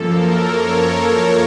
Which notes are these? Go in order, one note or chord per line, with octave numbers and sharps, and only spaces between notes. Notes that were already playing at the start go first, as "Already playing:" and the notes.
Already playing: F#2 F3 A#3 A4
A#4
C#5